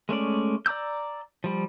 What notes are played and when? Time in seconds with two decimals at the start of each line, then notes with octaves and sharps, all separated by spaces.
0.09 G#3 A3 C#4 D5
0.66 D5 A#5 D6 E6 G6
1.44 F3 G3